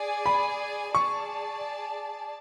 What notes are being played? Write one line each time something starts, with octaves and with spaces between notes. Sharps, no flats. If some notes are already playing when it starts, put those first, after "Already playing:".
Already playing: G#4 D5 G#5
B5
G#4 D5 A5 C#6